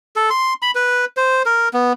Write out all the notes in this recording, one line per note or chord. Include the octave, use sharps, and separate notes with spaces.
A4
C6
B5
B4
C5
A#4
B3